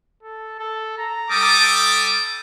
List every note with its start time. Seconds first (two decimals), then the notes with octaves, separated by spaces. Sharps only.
0.23 A4
0.59 A4
0.98 A#5
1.30 G3 A4 D6 D#6